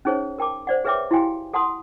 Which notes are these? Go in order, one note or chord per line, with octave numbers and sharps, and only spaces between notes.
C#4 D#4 G#4 C5 C#5
A#4 G5 A5 D6
C5 D5 F#5
G#4 B4 C#5 E5 G5 D6
E4 F#4 G4 F5 G5 G#5
A4 F#5 A5 C6 D#6